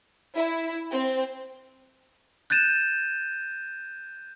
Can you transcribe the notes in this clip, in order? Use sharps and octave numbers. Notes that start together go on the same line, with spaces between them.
E4
C4
F#6 G6 A6 D#7 E7